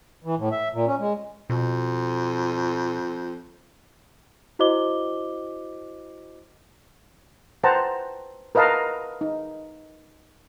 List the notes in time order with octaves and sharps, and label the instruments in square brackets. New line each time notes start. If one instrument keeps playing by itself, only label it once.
[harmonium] E3
A2
E5
A#2
C#4
G#3
[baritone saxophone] F2 [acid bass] B2
[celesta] E4 F#4 C5 D#5 D6 G7
[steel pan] B4 C5 F#5 G5 A5 A#5
A#4 B4 D#5 F5 A5 A#5
D#4